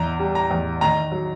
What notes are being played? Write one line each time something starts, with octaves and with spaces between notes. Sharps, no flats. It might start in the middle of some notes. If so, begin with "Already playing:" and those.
Already playing: E2 A#5
G3
A#5
E2
D#3 A#5
F#3